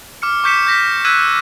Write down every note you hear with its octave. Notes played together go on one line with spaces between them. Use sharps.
D6 F6 C#7
C#6 D6 G6 B6 C#7 E7
G6 A#6 B6
E6 F#6 G#6 B6 D#7